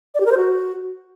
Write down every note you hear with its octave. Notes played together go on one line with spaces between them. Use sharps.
D5
G4
A#4
C5
F#4